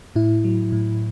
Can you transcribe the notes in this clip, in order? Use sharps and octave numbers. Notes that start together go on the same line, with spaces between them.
A2 E4
F#3
A2